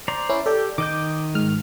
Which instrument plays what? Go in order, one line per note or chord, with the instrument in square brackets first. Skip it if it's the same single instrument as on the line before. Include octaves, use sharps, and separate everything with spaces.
[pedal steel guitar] C5 D5 A#5
[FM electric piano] C#4 E4
[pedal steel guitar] G4 [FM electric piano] A4 D5 G5
[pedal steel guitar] D#3 D#5 G6 [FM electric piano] D6
[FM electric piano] G#2 F6